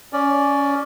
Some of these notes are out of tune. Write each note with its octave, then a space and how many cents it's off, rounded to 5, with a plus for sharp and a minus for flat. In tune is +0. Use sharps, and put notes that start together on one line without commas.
C#4 +15 D5 +0